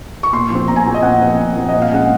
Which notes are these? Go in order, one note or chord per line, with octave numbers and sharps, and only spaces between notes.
C#6
A#2 C6
F3
C4
A#2 A#5
G#5
F3 C4
D#5
A#2 F#5
F3 C4
A#2
F3 C4
A#2 D#5
F5
G#3 C#4 F#5